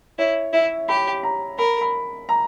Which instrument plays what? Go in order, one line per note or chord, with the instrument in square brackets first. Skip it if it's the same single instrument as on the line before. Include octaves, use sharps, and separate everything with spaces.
[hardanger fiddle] E4 [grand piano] C#5
[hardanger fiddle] E4 [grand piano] E5
[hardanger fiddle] G4 [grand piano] B5
[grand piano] A#5
[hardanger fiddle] A#4 [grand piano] B5
[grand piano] B5
A#5